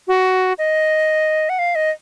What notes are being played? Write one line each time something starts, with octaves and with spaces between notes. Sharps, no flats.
F#4
D#5
F#5
F5
D#5